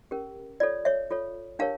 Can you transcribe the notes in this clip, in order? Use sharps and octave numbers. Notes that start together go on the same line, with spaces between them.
C#4 G4 A#4
F4 A4 C#5 D5
C#5 E5
F4 A4 C#5
D4 G4 A#4 C#5 F5 A5